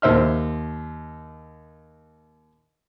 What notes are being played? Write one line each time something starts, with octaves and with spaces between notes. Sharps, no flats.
D#2 C5 E5 F6